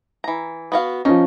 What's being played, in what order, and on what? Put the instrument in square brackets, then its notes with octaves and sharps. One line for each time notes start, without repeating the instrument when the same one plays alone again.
[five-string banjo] E3 A#5
B3 F#4 F5
[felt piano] F3 C#4 [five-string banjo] D#4